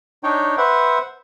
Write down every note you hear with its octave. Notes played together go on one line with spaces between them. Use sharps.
D4 D#4 C#5 G5
B4 C5 E5 F#5